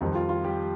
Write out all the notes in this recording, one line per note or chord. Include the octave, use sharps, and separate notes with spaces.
F2 D#3 G3 D#4
F4
F4
G3 G4